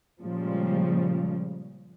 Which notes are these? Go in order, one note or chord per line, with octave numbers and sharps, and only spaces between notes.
A#2 C#3 F3 G3 G#3